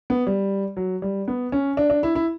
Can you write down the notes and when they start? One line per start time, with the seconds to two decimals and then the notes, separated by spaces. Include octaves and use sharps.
0.10 B3
0.27 G3
0.77 F#3
1.02 G3
1.28 B3
1.52 C#4
1.77 D4
1.90 D4
2.03 E4
2.15 E4